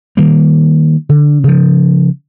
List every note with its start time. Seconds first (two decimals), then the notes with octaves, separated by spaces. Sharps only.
0.17 D#3 G3 A#3
1.09 D3
1.44 C#3 F3